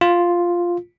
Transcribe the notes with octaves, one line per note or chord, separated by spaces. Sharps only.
F4